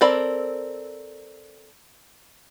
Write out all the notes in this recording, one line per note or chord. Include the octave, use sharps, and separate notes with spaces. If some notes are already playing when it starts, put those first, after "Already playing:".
C4 A4 A#4 D5 B5